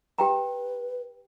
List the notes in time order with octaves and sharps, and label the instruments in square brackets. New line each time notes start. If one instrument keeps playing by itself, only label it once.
[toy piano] G4 G5 A#5 [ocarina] B4